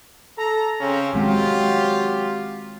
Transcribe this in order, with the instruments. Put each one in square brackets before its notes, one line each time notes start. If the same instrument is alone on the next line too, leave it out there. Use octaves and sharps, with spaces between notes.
[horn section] A4 A#5
C#3 C4 C#4
[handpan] D#3 G#3 C4 [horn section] F#3 F4 G4